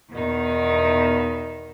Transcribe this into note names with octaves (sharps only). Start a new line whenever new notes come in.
E2 B2 D#3 D#4